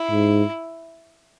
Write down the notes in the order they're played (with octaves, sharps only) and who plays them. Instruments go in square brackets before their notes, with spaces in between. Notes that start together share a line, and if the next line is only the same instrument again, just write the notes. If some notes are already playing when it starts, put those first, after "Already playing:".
Already playing: [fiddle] E4
[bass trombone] G#2